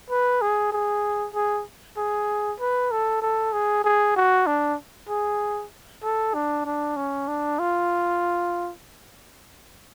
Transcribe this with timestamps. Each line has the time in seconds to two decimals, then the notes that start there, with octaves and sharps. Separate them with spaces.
0.10 B4
0.42 G#4
0.72 G#4
1.34 G#4
1.97 G#4
2.60 B4
2.91 A4
3.22 A4
3.53 G#4
3.84 G#4
4.16 F#4
4.47 D4
5.09 G#4
6.03 A4
6.34 D4
6.66 D4
6.96 C#4
7.28 D4
7.59 F4